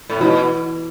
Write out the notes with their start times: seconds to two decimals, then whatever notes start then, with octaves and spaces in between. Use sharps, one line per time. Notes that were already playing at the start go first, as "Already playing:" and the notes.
0.10 A2
0.20 B2 E3